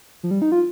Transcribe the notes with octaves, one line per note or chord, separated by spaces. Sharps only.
F3
G3
D#4
F4